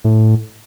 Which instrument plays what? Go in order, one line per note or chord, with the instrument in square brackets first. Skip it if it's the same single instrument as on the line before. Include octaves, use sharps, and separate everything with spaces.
[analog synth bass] A2